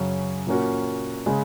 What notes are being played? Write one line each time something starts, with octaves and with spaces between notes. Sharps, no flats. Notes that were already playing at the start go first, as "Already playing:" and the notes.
Already playing: F#2 C#3 F#3 C#4
A#2 A#3 C#4 F#4
C#3 G#3